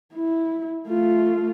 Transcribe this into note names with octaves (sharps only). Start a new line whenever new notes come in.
E4
A3 F4